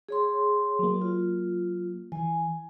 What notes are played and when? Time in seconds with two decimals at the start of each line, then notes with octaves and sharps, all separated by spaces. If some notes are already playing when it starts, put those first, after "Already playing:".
0.09 G#4 C#5 C6
0.79 F#3 A#3
1.01 F4
2.12 E3 G#5